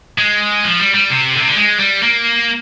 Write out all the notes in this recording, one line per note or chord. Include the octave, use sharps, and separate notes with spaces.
G#3
F3
G3
G3
C3
D3
C3
D3
G#3
G3
A#3